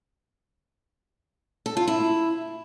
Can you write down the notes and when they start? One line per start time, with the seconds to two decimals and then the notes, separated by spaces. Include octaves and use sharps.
1.66 A4
1.77 F4
1.88 E4